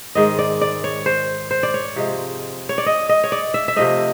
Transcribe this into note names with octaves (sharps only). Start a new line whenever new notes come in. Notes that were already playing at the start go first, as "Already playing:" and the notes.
G#2 D#3 G#3 D#5
D5
D5
C#5
C5
C5
D5
C#5
C3 F3 G#3
C#5
D5
D#5
D#5
C#5
D5
E5
E5
C3 F3 A3 D#5